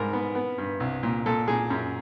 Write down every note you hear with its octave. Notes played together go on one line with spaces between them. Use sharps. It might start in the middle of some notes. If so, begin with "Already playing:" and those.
Already playing: G#2 G3 A#4
B3
B3
G2
C2
A#2
A#2 A4
A#2 G#4
F#2